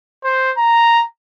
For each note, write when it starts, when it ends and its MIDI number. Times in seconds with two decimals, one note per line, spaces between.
0.25 0.51 72
0.57 1.03 82